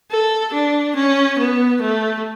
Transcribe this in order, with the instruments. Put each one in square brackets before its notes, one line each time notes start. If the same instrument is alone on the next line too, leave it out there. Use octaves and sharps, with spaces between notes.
[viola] A4
D4
C#4
B3
A3